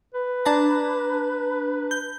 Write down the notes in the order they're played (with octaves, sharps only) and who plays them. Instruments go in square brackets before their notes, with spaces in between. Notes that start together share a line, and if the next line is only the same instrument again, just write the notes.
[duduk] B4
[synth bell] D4 A5 A#5
G6